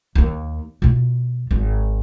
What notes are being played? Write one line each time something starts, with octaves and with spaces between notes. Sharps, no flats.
D#2 A#3
B2 F4
G#1